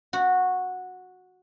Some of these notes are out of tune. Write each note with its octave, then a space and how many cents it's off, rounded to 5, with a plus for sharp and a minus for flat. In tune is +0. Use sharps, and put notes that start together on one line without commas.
F#4 -10